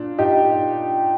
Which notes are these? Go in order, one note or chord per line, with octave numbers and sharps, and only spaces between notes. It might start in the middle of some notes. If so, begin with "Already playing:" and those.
Already playing: A#2 D4
A#2 D#4 G4